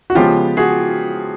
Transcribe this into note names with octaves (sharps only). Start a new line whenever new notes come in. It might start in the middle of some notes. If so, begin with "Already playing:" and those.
F#4
C#3 F3 G#3 B3 F4 G4
F#4 G#4